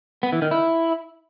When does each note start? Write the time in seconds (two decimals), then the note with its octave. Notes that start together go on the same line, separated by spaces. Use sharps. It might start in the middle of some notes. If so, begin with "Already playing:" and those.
0.23 B3
0.32 E3
0.42 D#3
0.51 E4